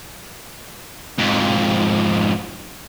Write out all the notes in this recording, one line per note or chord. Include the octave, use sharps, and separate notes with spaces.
F2 G#2